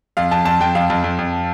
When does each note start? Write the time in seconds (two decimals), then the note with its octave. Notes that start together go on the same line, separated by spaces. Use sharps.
0.17 F2 F5
0.31 F2 A5
0.45 F2 A5
0.61 F2 G5
0.75 F2 F5
0.90 F2
1.04 F2
1.19 F2